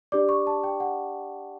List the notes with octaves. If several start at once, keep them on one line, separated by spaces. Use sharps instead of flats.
D4 G4 D5 D6
C#6
A5
G5
F#5